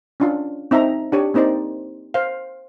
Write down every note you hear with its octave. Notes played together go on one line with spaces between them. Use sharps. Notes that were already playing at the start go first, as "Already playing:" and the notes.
C#4 D4 F4
C4 D#4 E5 A5 A#5
D4 G4 C#5
A#3 C4 D#4 C5 D5
C5 F5